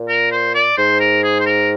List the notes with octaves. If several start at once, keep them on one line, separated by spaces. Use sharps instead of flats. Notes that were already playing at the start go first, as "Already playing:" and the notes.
Already playing: A#2
A#4
C5
D5
G#2 C5
A#4
G#4
C5
A#4